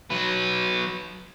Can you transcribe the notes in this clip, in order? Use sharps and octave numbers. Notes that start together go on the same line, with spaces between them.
F#3 B4